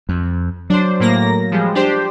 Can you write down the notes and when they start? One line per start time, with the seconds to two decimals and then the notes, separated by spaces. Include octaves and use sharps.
0.09 F2
0.70 F#3 D4 C5
1.00 A2 A#3 A#6
1.51 F3 G3 G#3
1.75 D4 G4 C5